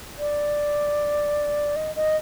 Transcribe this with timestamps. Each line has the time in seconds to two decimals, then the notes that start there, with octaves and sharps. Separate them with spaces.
0.19 D5
1.76 D#5
1.96 D#5